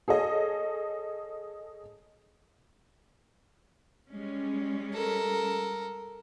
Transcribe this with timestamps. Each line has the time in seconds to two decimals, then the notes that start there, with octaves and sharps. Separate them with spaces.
0.08 G#4 A4 C#5 D#5
4.10 G3 G#3 C#4
4.93 A4 A#4